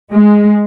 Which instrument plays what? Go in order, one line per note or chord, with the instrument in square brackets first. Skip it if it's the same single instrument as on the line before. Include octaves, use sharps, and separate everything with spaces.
[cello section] G#3